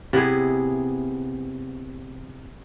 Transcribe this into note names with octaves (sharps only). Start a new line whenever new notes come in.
C3 B3 E4 G#4